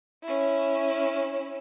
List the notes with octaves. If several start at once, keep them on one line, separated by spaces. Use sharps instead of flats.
C#4 E4